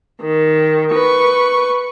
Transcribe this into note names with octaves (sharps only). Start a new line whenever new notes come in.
D#3
B4 C#6